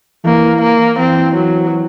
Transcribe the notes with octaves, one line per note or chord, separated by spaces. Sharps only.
E3 A#3
A#3
E3 C4
F#3